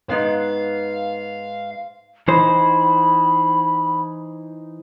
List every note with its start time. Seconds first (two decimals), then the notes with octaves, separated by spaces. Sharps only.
0.10 G#2 B3 F5
2.28 E3 D#4 C5 B5